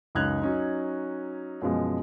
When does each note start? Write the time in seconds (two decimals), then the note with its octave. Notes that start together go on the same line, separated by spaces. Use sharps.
0.15 C#2 F#2 D#4 F#6 G#6 F7
0.41 F#3 C#4 D#4
1.62 F#2 B2 F3 G#3